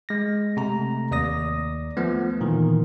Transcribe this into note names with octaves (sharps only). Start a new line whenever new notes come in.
G#3 A#6
C3 A3 A#5
D#2 D5 D#6 A#6
F3 A3 B3
A#2 D#3 E3